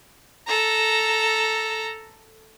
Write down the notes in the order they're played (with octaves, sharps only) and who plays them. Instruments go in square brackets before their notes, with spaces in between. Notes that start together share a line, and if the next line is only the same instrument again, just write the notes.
[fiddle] A4 A#5